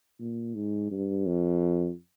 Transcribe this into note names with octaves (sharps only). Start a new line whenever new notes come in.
A#2
G#2
G2
F2